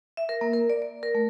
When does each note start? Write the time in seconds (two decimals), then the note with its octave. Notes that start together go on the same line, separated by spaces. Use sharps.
0.17 E5
0.29 A#4
0.41 A#3
0.53 A#4
0.70 D5
0.82 D5
1.03 A#4
1.15 A3